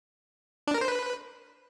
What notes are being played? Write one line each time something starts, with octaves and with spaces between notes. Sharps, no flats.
D4
A#4
C5
B4